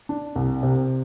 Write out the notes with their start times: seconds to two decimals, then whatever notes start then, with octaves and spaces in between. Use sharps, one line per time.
0.09 D4
0.36 C2
0.63 C3